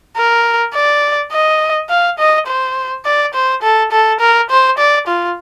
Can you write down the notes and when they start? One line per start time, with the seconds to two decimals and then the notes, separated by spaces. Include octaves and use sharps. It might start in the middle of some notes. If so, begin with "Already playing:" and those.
0.17 A#4
0.74 D5
1.32 D#5
1.89 F5
2.18 D#5
2.47 C5
3.05 D5
3.34 C5
3.63 A4
3.92 A4
4.21 A#4
4.50 C5
4.78 D5
5.07 F4